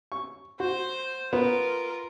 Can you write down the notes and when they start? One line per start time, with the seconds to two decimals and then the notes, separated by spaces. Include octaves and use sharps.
0.12 C#6
0.60 F#4 C5
1.33 B3 F4 A#4